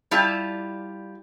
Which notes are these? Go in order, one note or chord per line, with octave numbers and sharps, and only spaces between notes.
G3 E4 F4 G4 D5 A5